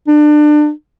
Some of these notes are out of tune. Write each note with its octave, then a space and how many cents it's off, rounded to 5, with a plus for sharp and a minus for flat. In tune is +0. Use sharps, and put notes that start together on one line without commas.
D4 +30